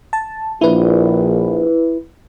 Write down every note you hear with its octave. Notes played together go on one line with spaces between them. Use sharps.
A5
A#1 E4 B4